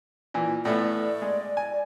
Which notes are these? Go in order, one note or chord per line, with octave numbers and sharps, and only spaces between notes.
A#2 E3
A2 A3 B3 D5
G#3
G#5